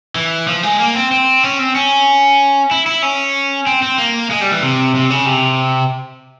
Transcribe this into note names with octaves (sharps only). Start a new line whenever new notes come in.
E3
F3
G#3
A#3
C4
C4
C#4
C4
C#4
E4
E4
C#4
C4
C4
A#3
G#3
G3
E3
C3
C3
C#3
C3